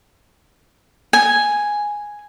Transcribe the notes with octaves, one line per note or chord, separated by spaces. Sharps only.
G#5